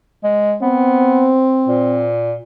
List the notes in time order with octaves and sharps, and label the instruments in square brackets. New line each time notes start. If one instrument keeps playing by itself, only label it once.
[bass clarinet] G#3
[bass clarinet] B3 [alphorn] C4
[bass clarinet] A#2